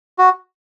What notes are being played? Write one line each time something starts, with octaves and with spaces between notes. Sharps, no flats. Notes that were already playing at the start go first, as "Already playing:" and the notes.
F#4